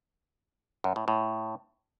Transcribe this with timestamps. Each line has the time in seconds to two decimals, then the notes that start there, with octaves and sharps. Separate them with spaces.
0.84 F#2
0.96 A2
1.08 A2